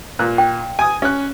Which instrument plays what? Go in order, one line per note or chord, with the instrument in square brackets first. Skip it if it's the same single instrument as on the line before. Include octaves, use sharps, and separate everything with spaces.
[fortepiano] A#2 F#6
[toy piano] G5
[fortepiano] G#5 D#6
C#4 F#6